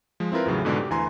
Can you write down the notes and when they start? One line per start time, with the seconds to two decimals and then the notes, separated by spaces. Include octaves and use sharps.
0.20 F3 G#3
0.32 C4 E4 F4 A#4 B4
0.46 E2 A2 C#3 F#3
0.65 G#2 B2 D3 G#3 D4
0.78 G4
0.90 D2 E3 G#5 A#5 C6